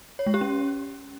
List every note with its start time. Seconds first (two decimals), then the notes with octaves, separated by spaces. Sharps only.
0.19 C#5
0.26 G#3
0.34 G4
0.41 C#4